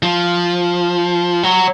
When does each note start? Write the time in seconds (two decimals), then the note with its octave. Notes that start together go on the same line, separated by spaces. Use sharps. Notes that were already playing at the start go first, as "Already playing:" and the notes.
0.03 F3
1.43 F#3